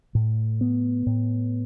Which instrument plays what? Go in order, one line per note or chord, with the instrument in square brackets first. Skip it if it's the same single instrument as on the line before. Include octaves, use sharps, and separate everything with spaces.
[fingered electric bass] A2
B3
A2